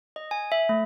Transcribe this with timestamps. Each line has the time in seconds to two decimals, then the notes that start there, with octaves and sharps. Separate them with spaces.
0.16 D#5
0.31 G#5
0.52 E5
0.69 A3